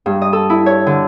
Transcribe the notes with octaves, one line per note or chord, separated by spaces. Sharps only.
G2
D#5
A4
E4
C#5
D3